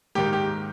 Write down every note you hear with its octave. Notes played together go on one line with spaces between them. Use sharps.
G#2 D#3 A#3 G4
G4